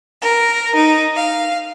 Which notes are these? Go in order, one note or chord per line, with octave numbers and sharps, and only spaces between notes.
A#4
D#4
F5